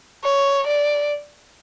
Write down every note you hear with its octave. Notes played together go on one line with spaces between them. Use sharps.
C#5
D5